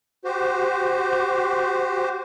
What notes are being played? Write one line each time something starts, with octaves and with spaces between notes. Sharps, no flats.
F#4 G4 C5